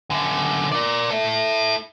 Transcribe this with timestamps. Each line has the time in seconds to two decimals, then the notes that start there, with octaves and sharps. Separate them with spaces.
0.10 F#2 D3
0.72 A#4 D5
1.11 E4 A4